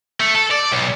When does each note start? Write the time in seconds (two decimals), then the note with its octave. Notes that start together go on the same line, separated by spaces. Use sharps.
0.20 A3
0.35 A4
0.51 D5
0.72 B1